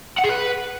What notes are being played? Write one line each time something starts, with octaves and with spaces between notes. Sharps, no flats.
F#5
G#4
B4